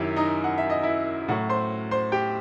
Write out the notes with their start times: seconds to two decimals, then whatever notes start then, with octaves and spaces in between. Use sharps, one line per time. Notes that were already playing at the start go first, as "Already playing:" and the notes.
Already playing: F#2 D#3 F#3 E4 G4 E5
0.16 D#4 D#5
0.44 F#5
0.58 E5
0.70 D#5
0.83 E4 E5
1.28 A2 F#3 F#4 F#5
1.49 C5 C6
1.91 C5 C6
2.12 G4 G5